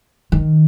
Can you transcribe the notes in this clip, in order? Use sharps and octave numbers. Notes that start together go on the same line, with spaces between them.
D#3